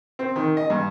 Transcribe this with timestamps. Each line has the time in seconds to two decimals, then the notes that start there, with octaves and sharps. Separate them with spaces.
0.19 C4
0.36 D#3
0.57 D#5
0.70 G2